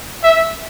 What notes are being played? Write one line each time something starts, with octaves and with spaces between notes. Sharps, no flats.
E5